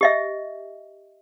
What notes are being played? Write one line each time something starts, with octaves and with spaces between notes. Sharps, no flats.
G4 D#5 E5